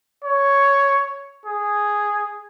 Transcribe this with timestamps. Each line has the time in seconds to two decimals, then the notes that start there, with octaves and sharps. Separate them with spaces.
0.24 C#5
1.45 G#4